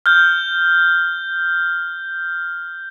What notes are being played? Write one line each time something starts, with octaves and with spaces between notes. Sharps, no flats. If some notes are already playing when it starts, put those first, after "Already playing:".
F6 G6